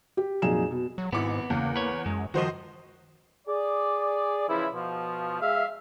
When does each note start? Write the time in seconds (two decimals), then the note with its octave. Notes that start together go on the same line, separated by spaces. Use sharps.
0.17 G4
0.42 F2 A#2 F#3 D#4 G#4 E7
0.71 B2
0.98 F#3
1.13 G#1 G#2 B3 E4 D6
1.50 E2 C#3 A#3
1.76 B4 C#5
2.06 F#2 G#3
2.34 C#2 G2 D#3 F3 F#4 C5 D#5
3.48 G#4 D5
4.49 C#3 E3 F3 E4
4.74 B2 F3
5.40 G#3 E5 F5